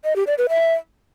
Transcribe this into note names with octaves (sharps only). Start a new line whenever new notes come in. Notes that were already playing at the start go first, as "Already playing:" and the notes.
D#5
G4
D5
B4
E5